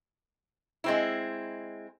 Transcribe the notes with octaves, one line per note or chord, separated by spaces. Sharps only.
G#3 C4 E4